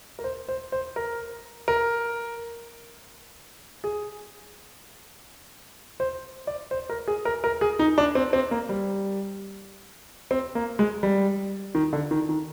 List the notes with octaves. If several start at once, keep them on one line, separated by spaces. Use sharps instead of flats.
A#4
C5
C5
C5
A#4
A#4
G#4
C5
D5
C5
A#4
G#4
A#4
A#4
G#4
D#4
D4
C4
C4
A#3
G3
C4
A#3
G#3
G3
D#3
D3
D#3
D#3